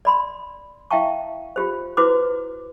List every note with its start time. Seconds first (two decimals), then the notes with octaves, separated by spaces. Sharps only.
0.05 D5 B5 C6
0.91 E4 E5 F5 G5 A5 C#6
1.56 F4 G4 C5
1.97 E4 F#4 B4 C5 D6